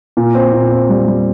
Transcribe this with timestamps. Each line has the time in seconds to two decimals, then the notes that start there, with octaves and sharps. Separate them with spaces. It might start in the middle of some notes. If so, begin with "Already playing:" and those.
0.17 A#2
0.35 C4
0.53 A#2
0.72 C4
0.89 G3
1.07 G3